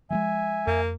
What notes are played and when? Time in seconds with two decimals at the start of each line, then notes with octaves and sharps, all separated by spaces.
0.10 F3 G3 G#3 E5 G#5
0.67 F2 A#3